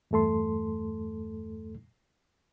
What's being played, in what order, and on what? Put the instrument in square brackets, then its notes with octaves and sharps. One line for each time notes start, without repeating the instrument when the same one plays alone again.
[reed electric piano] E2 G2 A3 A4 C6